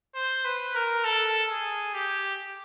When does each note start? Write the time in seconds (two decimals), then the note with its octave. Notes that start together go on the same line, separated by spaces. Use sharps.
0.15 C5
0.45 B4
0.75 A#4
1.04 A4
1.50 G#4
1.94 G4